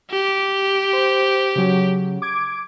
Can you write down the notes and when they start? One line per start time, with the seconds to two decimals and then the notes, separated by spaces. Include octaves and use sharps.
0.11 G4
0.93 C5
1.55 C#3 F#3
2.22 D6 G#6 D7